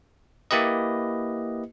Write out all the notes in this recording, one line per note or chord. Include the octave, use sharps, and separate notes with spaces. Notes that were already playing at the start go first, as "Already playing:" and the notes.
A#3 E4 G4 B4 D#5